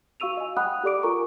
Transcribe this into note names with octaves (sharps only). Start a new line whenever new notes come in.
F#4 F5 C#6 E6 D#7 F7
D#5 G#5
F#5 G5 B5 D#6 F#6
G4 A4 D5 D6 D7
F4 A4 A#4 G#5 A#5 C#6